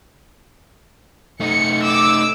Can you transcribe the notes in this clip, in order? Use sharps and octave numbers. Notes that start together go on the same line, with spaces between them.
A3 D#4 C#7
D6 E6